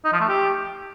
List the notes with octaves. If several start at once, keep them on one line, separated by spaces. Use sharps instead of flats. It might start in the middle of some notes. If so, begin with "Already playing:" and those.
D#4
F3
A3
G4